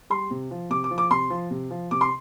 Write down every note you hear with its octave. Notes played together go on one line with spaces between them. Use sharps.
G3 C6
C3
F3
C3 D6
D6
F3
D6
C3 C6
F3
C3
F3
C3 D6
C6